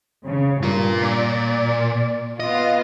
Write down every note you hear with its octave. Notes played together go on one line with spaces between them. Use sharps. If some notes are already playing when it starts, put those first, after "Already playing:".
C#3
G2 F4 A#4
A#2 D5
B3 F4 D#5